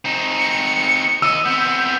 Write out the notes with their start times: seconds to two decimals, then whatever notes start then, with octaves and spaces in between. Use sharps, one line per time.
0.05 C4 D#4
0.38 C#7
1.22 D#2 D#5 E6
1.45 B3 C4 G6